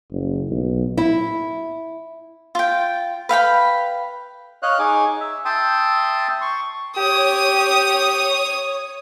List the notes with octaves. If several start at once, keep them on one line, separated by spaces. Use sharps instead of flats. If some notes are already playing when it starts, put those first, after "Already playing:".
F#1
B1
E4
F4 G5
B4 F5 G5 B5
C#5 D#5 F5 F#6
D#4 G#4 G#5 D6
E5
E5 G5 A5 C6 D#6
C6 C#6
G4 C#5 D#6